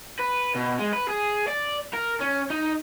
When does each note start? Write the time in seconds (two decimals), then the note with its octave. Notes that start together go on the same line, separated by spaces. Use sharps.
0.20 B4
0.56 B2
0.79 G#3
0.93 B4
1.08 G#4
1.47 D5
1.93 A#4
2.20 C#4
2.50 D#4